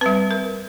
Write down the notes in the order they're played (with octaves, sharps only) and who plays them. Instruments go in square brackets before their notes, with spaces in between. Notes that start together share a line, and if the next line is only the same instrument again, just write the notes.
[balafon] G3 C4 B4
A#4